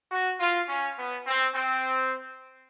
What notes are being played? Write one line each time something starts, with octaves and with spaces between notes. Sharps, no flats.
F#4
F4
C#4
B3
C4
C4